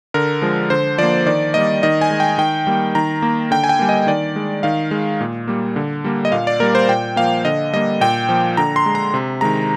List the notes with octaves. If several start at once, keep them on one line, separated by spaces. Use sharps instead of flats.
D3 A#4
F3 G#3
D3 C5
F3 A#3 D5
D#3 D5
G3 A#3 D#5
D#3 D#5
G#5
G#3
G5
D#3 G5
G3 A#3
D#3 A#5
A#3
D3 G5
G#5
G5
G3 A#3
D#5
D#3 D5
G#3
D#3 F5
G#3
A#2
G3 A#3
D3
G3 A#3
D#5
A#2 F5
D5
G3 A#3 A#4
C5
A#2 G5
F3 A#3 F5
D3 D#5
G3 A#3 D#5
A#2 G5
F3 A#3
D3 A#5
C6
G#3
A#5
C3
D#3 G#3 A#5